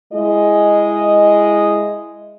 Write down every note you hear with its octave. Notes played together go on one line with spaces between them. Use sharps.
G#3 E4 D#5